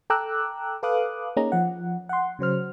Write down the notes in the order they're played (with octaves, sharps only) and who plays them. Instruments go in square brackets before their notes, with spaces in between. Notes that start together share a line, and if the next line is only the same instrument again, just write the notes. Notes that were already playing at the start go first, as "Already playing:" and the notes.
[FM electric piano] A4 G5 A#5 D6 E6 F#6
A4 B4 F5 D6 D#6 F#6
A#3 C#4 D#4 G#4 A#5
F3 F#5
F#5 C6
C#3 F#3 C5 F6